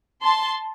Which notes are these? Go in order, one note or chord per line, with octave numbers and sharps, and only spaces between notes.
A5 C6